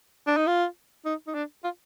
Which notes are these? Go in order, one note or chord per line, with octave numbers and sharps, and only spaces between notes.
D4
D#4
F4
D#4
D#4
D4
F4